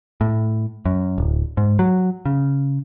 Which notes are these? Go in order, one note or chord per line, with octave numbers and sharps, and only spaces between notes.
A2
F#2
D1
G#2
F#3
C#3